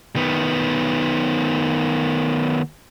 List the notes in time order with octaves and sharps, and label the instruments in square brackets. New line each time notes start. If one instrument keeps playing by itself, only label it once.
[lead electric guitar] D#3 B3